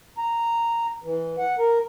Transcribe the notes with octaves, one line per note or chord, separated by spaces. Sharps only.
A#5
E3
F#5
A#4